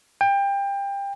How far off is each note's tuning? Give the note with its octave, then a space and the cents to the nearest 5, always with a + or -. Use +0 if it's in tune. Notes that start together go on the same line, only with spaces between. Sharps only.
G5 +25